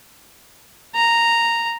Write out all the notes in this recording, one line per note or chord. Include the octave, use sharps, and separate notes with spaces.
A#5